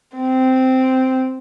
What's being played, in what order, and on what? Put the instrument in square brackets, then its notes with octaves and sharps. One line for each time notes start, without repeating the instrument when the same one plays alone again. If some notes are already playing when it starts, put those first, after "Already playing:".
[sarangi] C4